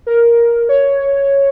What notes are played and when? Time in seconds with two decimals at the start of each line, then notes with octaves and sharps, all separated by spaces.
0.07 A#4
0.69 C#5